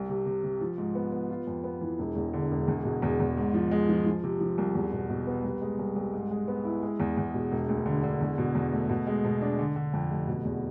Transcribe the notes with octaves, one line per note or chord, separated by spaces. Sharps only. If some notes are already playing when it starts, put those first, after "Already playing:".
Already playing: C2
C3
C3
C3
F3
G#2
B3
B3
F4
F2
B3
E3
E1
E2
D3
E1
E2
B2
E2
E2
G#2
F3
G#3
F3
F3
C3
F3
C2
E2
B2
B2
B3
C2
G#3
C2
C2
G#2
G#3
B3
E4
G#3
E2
E2
B2
E1
D2
D3
D3
E2
B2
E2
A3
B2
G#3
B2
D4
D3
D3
F2
F1
B2
E2